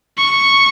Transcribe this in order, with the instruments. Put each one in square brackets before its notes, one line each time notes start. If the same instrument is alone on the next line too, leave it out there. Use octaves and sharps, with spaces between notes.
[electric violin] C#6